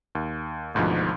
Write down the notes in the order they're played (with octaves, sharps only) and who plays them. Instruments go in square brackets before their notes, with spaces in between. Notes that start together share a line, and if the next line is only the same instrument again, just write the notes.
[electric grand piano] D#2
G#1 D2 G#2 B2 F3